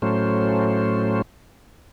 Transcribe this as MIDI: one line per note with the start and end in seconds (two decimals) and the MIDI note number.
0.02 1.22 45
0.02 1.22 54
0.02 1.22 57
0.02 1.22 61
0.02 1.22 72